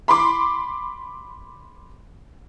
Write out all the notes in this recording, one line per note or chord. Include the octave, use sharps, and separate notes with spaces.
B5 C6 D6